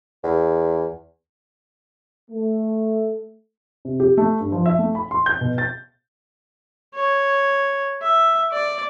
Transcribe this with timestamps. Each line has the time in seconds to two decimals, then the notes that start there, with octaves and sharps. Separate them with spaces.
0.24 E2
2.31 A3
3.85 C3
4.00 G4
4.17 A3
4.40 G2
4.52 F3
4.66 E5
4.79 A3
4.95 B5
5.11 C6
5.26 G6
5.41 B2
5.58 A6
6.95 C#5
8.02 E5
8.52 D5